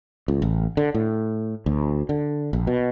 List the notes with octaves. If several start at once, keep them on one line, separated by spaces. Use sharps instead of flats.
C#2
A1
D3
A2
D2
D3
A#1
B2